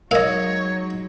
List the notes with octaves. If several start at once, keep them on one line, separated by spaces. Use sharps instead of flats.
F#3 G#3 D#4 A#4 C#5 D#5 F5